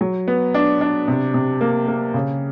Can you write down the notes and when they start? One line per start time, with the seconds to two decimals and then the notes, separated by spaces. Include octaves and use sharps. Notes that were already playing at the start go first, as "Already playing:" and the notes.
0.01 F#3
0.28 B3
0.54 D4
0.81 D4
1.08 C3
1.34 C3
1.61 A#3
1.88 A#3
2.14 C#3